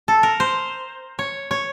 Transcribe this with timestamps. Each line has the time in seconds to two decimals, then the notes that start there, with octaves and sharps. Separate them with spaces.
0.08 A4
0.23 A#4
0.40 C5
1.19 C#5
1.51 C#5